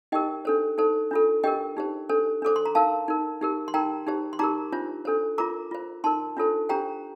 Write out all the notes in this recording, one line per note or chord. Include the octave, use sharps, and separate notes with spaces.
D#4 G4 A#4 D#5 G5
D4 A4 C5
D#4 A4 C5
D4 F4 A4
D4 G4 A#4 D#5 G5
D#4 G4 C5
D4 A4 C5
D4 A4 C5 D6
C6
A#5
D#4 A#4 F5 A5
D#4 A#4
D#4 G4 A#4
C6
D#4 A#4 G5 A#5
D#4 G4 C5
C6
D#4 G4 A#4 A#5 D6
D4 F4 C5
D4 A4 C5
F4 A#4 A#5 D6
F4 C5
D#4 A#4 A5 C6
D4 F4 A4 C5
D4 G4 C5 G5 A#5